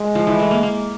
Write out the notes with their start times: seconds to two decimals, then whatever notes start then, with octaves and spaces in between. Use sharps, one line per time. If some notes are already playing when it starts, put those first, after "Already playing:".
Already playing: G#3
0.15 F3
0.27 E3
0.39 A3
0.51 A#3
0.63 A#3